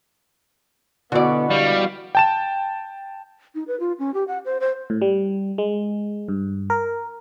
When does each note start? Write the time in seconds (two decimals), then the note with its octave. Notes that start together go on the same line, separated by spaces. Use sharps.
1.12 B2 D3 E3 B3 F#4 D5
1.51 G3 F5
2.15 G5 A5 E7
3.55 D#4
3.68 B4
3.80 F4
3.99 C#4
4.14 G4
4.28 F#5
4.45 C5
4.60 C5
4.90 A2
5.02 G3
5.58 G#3
6.28 G2
6.70 A#4